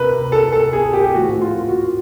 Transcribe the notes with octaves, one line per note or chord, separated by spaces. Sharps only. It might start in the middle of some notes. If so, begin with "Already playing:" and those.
Already playing: C3 A#4 B4
A4
A4
G#4
G4
A2 F3 F#4
F4
F#4